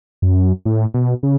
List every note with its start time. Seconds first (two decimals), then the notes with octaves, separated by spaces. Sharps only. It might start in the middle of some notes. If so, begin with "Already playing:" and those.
0.22 F#2
0.65 A2
0.94 B2
1.23 C#3